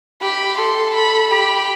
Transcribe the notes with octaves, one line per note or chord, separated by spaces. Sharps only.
G4 B5
A4 C6
B5
G4 B5